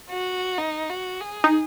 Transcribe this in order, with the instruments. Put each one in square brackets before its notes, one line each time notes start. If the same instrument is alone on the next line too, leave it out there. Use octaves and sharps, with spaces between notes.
[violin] F#4
D#4
F#4
G#4
[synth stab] D#4